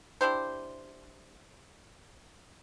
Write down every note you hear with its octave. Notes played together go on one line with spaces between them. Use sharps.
D4 E4 G4 C5